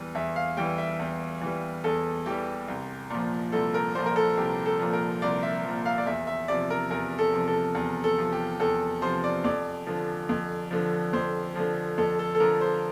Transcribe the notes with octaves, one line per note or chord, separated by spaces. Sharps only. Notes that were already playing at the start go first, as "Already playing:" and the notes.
Already playing: E2 E3 G3
E2 E5
F5
E3 G3 G5
E5
E2
E3 G3
E2 A4
E3 G3 G4
C2
A#2 F3
C2 A4
A#4
A#2 F3 C5
A#4
A4
C2 G4
A4
A#2 F3
A#4
C2 D5
E5
A#2 F3
F5
D5
E2 E5
E5
C3 F3 D5
A#4
E2 A#4
A4
C3 F3
A4
E2
A4
C3 F3
G4
E2 A4
C3 F3 C5
D5
F2 D5
D3 F3
F2
D3 F3
F2 C5
D3 F3
F2 A4
A4
A4
D3 F3 A#4
C5